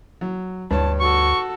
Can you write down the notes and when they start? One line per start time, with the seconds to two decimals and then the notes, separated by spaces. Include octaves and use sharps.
0.21 F#3
0.71 D2 G2 C#5 A5
1.00 F#4 A4 C#6